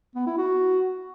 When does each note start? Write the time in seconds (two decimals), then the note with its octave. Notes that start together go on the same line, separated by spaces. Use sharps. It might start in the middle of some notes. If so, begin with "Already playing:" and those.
0.15 B3
0.26 E4
0.38 F#4